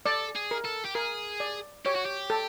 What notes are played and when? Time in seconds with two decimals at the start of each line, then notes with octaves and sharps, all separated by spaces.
0.06 A4 D5
0.36 G#4
0.51 A#4
0.65 A4
0.85 G4
0.95 G#4 A#4
1.40 D5
1.85 G4 C#5
1.95 F#4
2.05 G4
2.30 A4